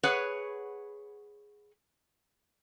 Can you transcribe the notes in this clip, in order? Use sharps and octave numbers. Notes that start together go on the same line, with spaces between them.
G#4 B4 C#5 F#5